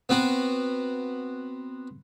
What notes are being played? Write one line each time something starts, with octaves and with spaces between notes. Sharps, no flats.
B3 C4 F#4